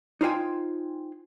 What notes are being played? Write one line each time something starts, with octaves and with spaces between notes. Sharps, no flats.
D#4 F4 C5 G5 G#5